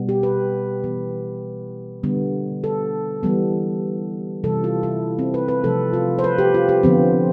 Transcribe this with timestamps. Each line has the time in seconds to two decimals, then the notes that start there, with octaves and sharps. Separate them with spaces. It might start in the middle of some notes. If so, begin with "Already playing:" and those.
Already playing: B2 G3 B3
0.09 G4
0.23 B4
0.84 E3 B3
2.04 D3 G3 B3
2.64 A4
3.23 E3 G3 B3
4.44 C3 E3 G3 A4
4.64 F4
4.83 E4
5.19 C4
5.34 B4
5.48 B4
5.64 C3 F3 A3 A4
5.93 F4
6.19 C5
6.24 B4
6.38 G4
6.54 F4
6.69 G4
6.83 D3 F3 B3 C4